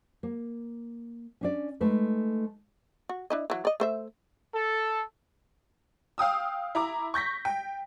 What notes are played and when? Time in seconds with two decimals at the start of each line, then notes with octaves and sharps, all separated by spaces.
0.23 A#3
1.41 C#4 D4 D5
1.81 G#3 A3 D#4 B4
3.09 F#4
3.30 D4 E4 D#5
3.50 E3 F#3
3.65 D5 D#5
3.80 A3 C5 E5
4.54 A4
6.18 F5 G5 D#6 E6
6.75 E4 A#5 D6
7.14 C#6 G6 A#6 B6
7.45 G5